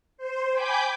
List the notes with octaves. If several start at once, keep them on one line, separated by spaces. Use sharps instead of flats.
C5
G5 G#5 B5 D6 G6